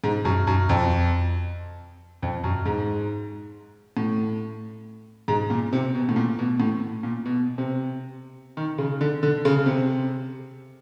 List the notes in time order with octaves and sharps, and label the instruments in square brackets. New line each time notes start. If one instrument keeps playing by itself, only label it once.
[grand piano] G#2
F#2
F#2
F2
F2
F#2
G#2
A2
G#2
A#2
C3
B2
A2
A#2
B2
A2
A#2
B2
C3
D#3
C#3
D3
D3
C#3
C3